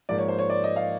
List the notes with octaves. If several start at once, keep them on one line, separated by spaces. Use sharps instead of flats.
G#2 F3 A#3 D5
C#5
C5
C#5
D5
D#5
F5